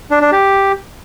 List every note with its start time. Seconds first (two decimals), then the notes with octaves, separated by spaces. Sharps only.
0.11 D4
0.21 D4
0.32 G4